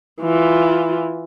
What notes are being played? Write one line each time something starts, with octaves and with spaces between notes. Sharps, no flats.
E3 F4